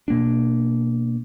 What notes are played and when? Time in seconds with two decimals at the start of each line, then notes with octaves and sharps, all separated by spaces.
0.08 B2 A#3 D4